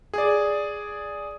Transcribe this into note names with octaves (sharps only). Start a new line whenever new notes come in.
G#4 D5